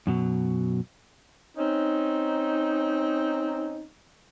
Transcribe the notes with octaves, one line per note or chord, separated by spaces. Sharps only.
F#2 B2 F#3
C4 C#4 D#4